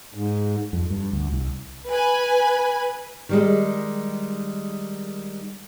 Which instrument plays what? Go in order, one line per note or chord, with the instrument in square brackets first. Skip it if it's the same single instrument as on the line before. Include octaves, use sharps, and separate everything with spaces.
[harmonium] G#2
[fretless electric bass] F2
G2
D2
C2
[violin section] B4 G#5
[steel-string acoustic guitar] D#3 G3 G#3